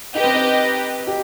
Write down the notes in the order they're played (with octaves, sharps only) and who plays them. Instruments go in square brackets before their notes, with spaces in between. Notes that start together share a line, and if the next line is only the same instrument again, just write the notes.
[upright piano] D#4 [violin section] G4 B4 D#5
[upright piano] C4
D#4
G4